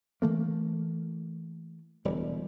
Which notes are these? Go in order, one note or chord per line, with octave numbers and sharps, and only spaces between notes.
E3 A3 A#3
E1 D2 G3